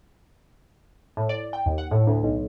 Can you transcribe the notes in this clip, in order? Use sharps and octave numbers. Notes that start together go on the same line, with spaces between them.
A2
D5
G5
D#2
F#5
A2
D2
B1